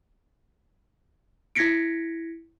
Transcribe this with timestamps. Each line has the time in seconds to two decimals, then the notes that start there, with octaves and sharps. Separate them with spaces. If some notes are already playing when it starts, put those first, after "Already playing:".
1.55 E4 G#6 A#6 B6 C#7 D7